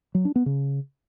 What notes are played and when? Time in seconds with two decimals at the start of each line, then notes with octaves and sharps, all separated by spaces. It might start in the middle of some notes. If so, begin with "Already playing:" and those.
0.15 F#3
0.25 D4
0.36 B3
0.46 C#3